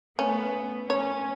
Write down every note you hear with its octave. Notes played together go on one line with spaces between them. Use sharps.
A3 B3 C#4
C#4 C#5